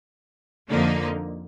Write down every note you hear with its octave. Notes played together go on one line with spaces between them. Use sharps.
F2 D3 F3 A#3 D#4